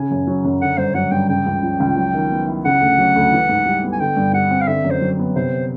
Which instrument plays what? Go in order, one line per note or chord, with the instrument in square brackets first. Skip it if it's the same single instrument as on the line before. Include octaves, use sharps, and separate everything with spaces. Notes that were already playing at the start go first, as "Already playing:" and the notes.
Already playing: [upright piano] C#3 [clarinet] G#5
[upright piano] F#2
F#3
F#2
[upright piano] D3 [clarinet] F#5
[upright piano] G2 [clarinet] C5
[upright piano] F#3 [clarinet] F#5
[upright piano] G2 [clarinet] G5
[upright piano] C#3 [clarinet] G5
[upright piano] C#2
F3
C#2
F#3
D#3
B3
E4
[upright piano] C#3 [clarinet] F#5
[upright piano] D2
F#3
D2
E3
G#2
G3
B3
[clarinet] G#5
[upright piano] D3 [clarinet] G5
[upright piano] G2
[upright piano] G3 [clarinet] F#5
[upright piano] C4
[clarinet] F5
[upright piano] D3 [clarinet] E5
[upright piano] F#2
[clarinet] C5
[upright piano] F#3
B3
[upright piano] C3 [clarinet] C5